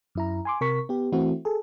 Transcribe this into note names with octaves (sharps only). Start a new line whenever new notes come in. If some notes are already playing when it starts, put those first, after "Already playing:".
F#2 E4 A#5
G#5 C6 D6
C3 A#4 C#6 B6
B3 G4
E3 A3 C4 E4 F#4
G#4 A4